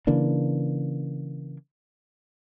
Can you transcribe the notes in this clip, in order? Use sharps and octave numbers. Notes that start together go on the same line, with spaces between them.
C#3 E3 A#3 D4